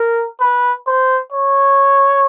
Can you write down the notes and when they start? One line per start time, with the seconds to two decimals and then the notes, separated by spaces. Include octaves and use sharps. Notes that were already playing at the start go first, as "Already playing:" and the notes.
Already playing: A#4
0.40 B4
0.87 C5
1.32 C#5